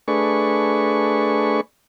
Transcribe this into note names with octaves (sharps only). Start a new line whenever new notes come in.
A3 D4 G#4 B4 C#6